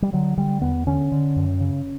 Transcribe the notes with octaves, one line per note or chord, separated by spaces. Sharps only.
G3
D3 F#3
D3 G3
E2 B3
D3 C#4
D3
F#2
C#3